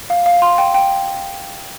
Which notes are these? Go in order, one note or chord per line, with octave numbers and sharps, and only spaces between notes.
F5
F5
C6
G5
G5